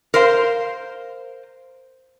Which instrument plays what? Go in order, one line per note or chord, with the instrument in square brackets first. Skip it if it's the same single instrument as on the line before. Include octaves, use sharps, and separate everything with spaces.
[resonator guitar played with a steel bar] A#4 C5 F5